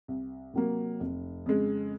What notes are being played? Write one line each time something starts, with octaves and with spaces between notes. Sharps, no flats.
C2
C3 F#3 A#3
F1
F2 C#3 G#3